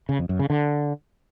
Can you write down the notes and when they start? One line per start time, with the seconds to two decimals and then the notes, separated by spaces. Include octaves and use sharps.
0.09 C#3
0.19 F2
0.29 F#2
0.39 C#3
0.50 D3